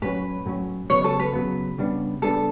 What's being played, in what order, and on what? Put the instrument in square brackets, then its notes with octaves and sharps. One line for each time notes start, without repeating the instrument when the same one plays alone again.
[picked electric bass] A2 F#3 C#4 [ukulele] B4
[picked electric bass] A2 F#3 C#4
[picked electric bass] C#3 F#3 B3 [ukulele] C#5
[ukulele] A4
B4
[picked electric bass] C#3 F#3 B3
C#3 G3 B3 D4
[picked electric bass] C#3 G3 B3 D4 [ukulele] A4